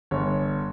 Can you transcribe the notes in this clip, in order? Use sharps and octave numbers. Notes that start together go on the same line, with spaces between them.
G1 C#5